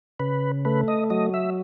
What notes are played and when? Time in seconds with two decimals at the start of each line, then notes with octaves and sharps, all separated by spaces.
0.20 C#3 B4
0.65 A3 B4
0.88 D#5
1.10 F#3 D#5
1.34 E5